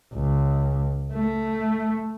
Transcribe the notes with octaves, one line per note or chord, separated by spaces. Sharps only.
C#2
A3